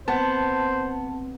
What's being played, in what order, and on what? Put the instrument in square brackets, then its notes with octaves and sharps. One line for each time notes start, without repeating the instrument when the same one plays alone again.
[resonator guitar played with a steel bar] B3 [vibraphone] C4 [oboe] C5 [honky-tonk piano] A5